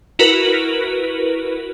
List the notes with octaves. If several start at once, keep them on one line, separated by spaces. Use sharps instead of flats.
E4 F#4 A#4 B4